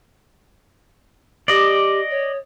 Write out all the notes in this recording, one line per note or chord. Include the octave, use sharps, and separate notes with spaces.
G4 D5 D#5
C#5